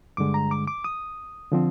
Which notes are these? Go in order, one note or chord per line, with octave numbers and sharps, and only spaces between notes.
G2 D3 G#3 D6
A#5
D6
D6
D#6
D3 F3 C4